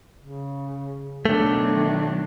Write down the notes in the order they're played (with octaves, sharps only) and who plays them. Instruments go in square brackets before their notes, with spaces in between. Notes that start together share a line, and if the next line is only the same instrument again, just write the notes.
[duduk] C#3
[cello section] B2 D#3 F#3 [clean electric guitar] A3 [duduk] D4